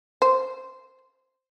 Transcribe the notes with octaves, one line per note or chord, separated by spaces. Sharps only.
C5